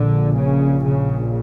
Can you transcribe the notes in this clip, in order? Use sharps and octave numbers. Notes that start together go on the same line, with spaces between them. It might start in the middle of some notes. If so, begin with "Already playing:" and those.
Already playing: A#1 A#2 D3
C#3
C#3